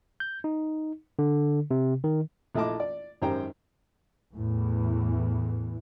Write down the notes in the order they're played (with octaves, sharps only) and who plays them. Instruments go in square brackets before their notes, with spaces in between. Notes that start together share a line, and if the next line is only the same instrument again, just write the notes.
[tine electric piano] G6
D#4
D3
C3
D#3
[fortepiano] A#1 A3 E4 D#5 A5 D6
D5
G#1 F#2 G4 C5 G5 A#5
[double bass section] E2 A2 E3